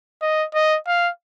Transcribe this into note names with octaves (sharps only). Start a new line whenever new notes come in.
D#5
D#5
F5